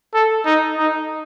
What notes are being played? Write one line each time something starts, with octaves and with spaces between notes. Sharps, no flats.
A4
D#4
D#4